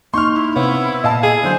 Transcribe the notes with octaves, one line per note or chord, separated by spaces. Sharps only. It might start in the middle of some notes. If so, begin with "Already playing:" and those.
A#3 D#4 C6 C#6 F6
E4
C3 B3 C#5 F5
A#2 D#5 F5 A5
G#4 G#6
D3 F#3 C5